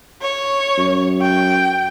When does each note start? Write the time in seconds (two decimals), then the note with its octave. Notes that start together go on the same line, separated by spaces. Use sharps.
0.21 C#5
0.78 F#2
1.21 G5